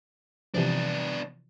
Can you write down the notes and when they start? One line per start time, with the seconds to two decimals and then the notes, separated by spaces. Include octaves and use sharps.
0.54 C3 E3 F3 B3 D4